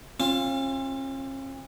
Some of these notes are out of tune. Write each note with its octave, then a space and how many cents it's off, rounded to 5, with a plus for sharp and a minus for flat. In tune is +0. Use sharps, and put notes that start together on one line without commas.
C#4 -45 F4 +0